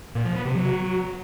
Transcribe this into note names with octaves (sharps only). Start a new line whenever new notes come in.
A#2
F3
B3
C3
F#3